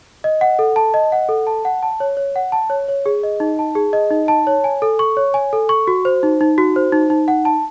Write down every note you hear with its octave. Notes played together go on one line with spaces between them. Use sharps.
D#5
F#5
A4
A5
D#5
F#5
A4
A5
F#5
A5
C#5
C#5
F#5
A5
C#5
C#5
G#4
D#5
D#4
A5
G#4
D#5
D#4
A5
C#5
G#5
A4
C#6
C#5
G#5
A4
C#6
F#4
C5
D#4
D#4
F#4
C5
D#4
D#4
F#5
A5